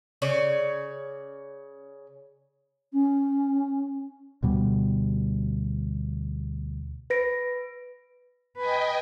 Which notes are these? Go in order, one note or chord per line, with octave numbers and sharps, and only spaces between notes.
C#3 C#5 D5
C#4
D2 B2 G3
B4 A#6 D7
B4 D#5 G5 G#5